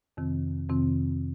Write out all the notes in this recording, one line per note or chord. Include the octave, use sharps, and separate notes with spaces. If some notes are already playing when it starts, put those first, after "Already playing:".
F2 C3 D#3 C4
F2 C3 D#3 C4